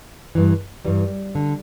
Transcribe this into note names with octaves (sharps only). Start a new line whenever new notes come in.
G2 E3
G2 E3 G3
D3